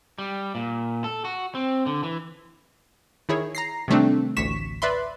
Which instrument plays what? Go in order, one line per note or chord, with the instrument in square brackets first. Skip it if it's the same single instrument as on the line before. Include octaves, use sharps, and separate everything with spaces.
[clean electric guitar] G3
A#2
A4
F#4
C4
D3
E3
[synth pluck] D#3 E4 G#4 C#5
A#5 A#6 C7
C3 D#3 G3 A3 C4 D4
A1 D2 C#6 B6 E7
B4 D5 E5 B5 C6